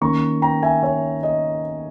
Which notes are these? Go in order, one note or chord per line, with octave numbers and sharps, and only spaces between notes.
D#3 A#3 C#4 A#5 C#6
G5 A#5
E5 G#5
C#5 E5
D#5